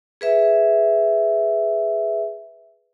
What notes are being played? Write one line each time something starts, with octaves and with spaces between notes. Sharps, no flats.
G#4 B4 E5